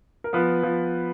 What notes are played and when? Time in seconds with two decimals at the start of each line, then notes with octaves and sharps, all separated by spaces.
0.24 A#4
0.33 F3 B3 B4
0.63 F3